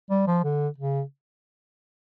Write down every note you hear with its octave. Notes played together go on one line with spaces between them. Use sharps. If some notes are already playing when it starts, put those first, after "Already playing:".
G3
F3
D3
C#3